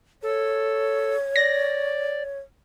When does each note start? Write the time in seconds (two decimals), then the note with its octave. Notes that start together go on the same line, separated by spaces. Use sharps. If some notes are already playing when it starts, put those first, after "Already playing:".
0.23 A4 C#5
1.36 D5 A#6